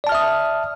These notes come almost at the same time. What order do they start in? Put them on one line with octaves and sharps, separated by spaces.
D5 A5 F6 E5 D#6